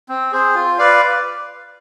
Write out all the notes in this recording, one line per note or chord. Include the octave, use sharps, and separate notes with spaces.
C4
G#4 C5
F4
B4 D5 F5